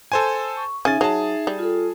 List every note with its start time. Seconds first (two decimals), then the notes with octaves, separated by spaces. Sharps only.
0.12 A4 C5 G#5
0.57 C#6
0.85 C#3 D#4 E5 G#5 A6
1.01 F#3 G#4 A5
1.47 G3
1.59 F4 A4